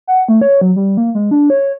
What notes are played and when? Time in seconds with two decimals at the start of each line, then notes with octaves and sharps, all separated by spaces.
0.07 F#5
0.29 A3
0.41 C#5
0.61 F#3
0.76 G3
0.97 A#3
1.15 G#3
1.31 D4
1.50 C#5